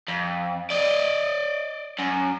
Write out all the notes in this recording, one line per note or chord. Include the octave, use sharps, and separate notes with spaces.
F2
D5 D#5
F#2